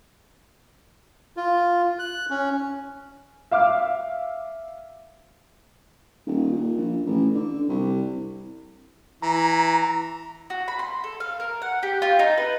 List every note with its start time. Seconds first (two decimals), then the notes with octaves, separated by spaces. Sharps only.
1.37 F4
1.99 F#6
2.30 C#4
3.51 E5 F5 D6 F6
6.26 D#1
6.52 A#2
6.77 A#1
7.06 A1
7.35 D3
7.69 C2
9.22 E3 A#5
10.50 F#4
10.68 B5
10.79 C6
11.04 A4
11.20 F5
11.40 A#4
11.62 F#5
11.83 G4
12.02 F4
12.19 D#4
12.37 B4